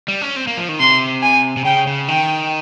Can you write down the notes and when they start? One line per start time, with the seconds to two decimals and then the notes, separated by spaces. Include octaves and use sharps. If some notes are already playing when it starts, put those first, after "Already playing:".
0.08 G3
0.22 C#4
0.36 C4
0.47 A#3
0.57 F3
0.69 D#3
0.80 C3 C6
1.22 G#5
1.57 C3
1.65 C#3 G5
1.87 C#3
2.08 D#3 G5